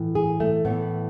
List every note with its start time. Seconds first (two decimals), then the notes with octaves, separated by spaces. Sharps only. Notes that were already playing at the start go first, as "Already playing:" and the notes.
Already playing: A2 E3
0.15 G#4
0.40 A3
0.65 A2 E3 B3